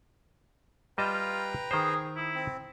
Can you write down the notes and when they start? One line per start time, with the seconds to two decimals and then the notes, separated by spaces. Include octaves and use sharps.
0.98 G3 F4 B4 D#5 G5 A5 A#5
1.71 D#3 G#4 C5
2.16 E4
2.35 C4